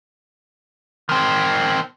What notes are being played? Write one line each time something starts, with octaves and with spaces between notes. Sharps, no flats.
D#3 C4